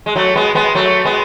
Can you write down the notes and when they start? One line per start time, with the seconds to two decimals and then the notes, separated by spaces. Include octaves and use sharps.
0.06 G#3
0.15 F#3 A3
0.35 G#3 B3
0.55 G#3 B3
0.75 F#3 A3
1.04 G#3 B3